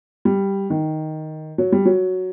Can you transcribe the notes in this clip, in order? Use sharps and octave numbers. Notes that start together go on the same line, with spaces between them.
G3
D#3
F#3
G3
F#3